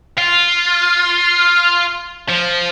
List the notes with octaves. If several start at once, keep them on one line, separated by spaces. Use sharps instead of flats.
F4
F3